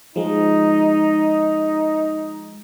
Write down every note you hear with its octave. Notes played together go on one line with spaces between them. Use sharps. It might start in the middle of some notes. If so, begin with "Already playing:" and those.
F3 G#3 D#4